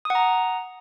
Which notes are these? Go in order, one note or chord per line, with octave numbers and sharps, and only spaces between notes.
F#5 A#5 D#6